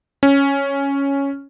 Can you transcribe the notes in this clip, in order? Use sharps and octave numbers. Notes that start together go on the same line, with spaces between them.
C#4